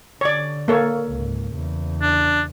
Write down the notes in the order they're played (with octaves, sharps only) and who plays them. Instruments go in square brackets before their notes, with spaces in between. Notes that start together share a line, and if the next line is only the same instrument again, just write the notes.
[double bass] D3 [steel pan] C#5 D5
[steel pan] A#3 A4 C#5
[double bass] C#2 G#2
E2 C#3
[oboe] D4